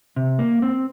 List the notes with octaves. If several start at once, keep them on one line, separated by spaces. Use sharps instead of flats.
C3
A#3
C4